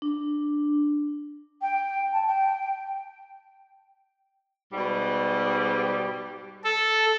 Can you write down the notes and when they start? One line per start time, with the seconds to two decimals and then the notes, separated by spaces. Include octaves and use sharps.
0.02 D4
1.61 G5
2.13 A5
2.27 G5
4.73 G#2 B2 G3
6.64 A4